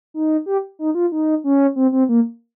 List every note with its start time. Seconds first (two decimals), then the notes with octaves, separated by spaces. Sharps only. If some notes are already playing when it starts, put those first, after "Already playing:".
0.14 D#4
0.46 G4
0.79 D#4
0.95 F4
1.12 D#4
1.44 C#4
1.76 C4
1.92 C4
2.09 A#3